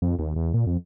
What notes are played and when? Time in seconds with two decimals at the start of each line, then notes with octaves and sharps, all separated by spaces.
0.02 F2
0.19 D#2
0.36 E2
0.54 A#2
0.67 F2